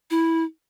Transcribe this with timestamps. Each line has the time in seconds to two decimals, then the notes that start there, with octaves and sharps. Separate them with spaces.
0.11 E4